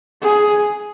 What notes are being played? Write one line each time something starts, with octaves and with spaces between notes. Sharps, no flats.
G#4